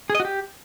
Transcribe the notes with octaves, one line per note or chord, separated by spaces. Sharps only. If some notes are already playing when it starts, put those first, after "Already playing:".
G#4
D#5
F#4
G4